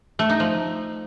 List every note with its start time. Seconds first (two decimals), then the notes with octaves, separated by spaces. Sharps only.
0.19 A3
0.30 D#4
0.40 F3